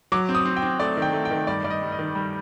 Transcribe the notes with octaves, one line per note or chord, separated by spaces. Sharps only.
F#3 D6
C4
D#6
C4
G5
C4
A3 D5
D#3
G5
A3
G5
D#3
G2 D5
G2 D5
D#5
G3
D#5
D#3
G3